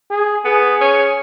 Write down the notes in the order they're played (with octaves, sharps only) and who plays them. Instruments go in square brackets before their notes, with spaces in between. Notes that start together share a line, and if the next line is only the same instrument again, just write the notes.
[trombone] G#4
[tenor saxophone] B3 [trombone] G#4
[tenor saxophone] C#4